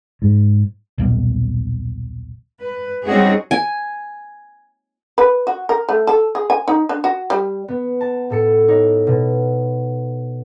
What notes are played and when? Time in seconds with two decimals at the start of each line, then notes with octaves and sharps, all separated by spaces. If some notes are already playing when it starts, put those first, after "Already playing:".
0.22 G#2
0.98 D#1 B1
2.61 B4
3.05 G3 C4 C#4 D#4 F#4 G#4
3.51 G#5
5.18 B4
5.47 F#4
5.69 A#4
5.89 A3
6.07 A4
6.35 G#4
6.50 G#5
6.68 D#4
6.89 D4
7.04 F#4
7.30 G3
7.68 B3
8.01 A5
8.30 A2 A4 C#7
8.68 D#4 C#5
9.07 B2